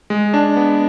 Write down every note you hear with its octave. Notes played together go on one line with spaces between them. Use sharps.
G#3
D4
B3